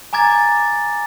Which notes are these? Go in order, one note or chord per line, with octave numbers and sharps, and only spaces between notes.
G#5 A#5 D6 G#6 A6